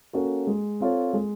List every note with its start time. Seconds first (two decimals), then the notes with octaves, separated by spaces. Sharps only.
0.13 A#3 C#4 F#4 A4
0.47 G#3
0.80 C4 F4 A4 C#5
1.13 G#3